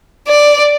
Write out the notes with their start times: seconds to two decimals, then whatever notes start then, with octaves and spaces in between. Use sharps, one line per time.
0.28 D5